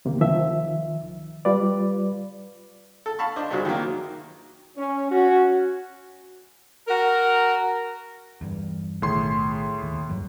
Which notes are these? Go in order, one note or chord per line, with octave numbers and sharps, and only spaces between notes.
D2 C3 D#3 A#3
C2 D#3 F3 E5
G3 F4 B4 D5
A4
F5 A5 B5 C#6
D4 C5 D#5
G2 C3 F4 F#4 G#4
D#3 F#3 A#3
C#4
C#4 F#4
F#4 A#4
E2 G2
B1 A2 D#3 G#4 C6
D#2
F1 G2 F#3